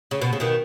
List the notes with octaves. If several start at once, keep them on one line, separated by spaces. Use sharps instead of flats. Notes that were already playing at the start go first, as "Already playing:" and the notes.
C#3
B2
C#3
B2 D#3